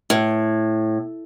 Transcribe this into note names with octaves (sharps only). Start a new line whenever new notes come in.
A2